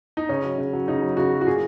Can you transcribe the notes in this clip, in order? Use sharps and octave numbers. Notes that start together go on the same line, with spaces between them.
D#4
C#3 C#4
F#3
C#3
F#3
C#3 D#4
F#3
C#3 F#4
F#3
F#4
A#2 G#4